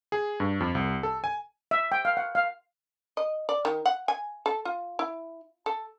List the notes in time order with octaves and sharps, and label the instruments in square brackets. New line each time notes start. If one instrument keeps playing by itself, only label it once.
[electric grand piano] G#4
G2
F2
C2
A4
G#5
[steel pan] E5
G5
F5
F#5
F5
[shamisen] D#5
D5
D#3
F#5
G#5
A4
F4
E4
A4